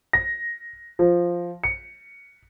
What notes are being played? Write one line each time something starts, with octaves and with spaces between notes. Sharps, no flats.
A#6
F3
C#7